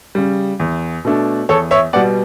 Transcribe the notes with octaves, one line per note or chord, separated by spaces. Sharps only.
C#3 G3
E2
B2 A3 D4
E2 A4 C#5
C#5 E5
B2 G3 B3 D5 F#5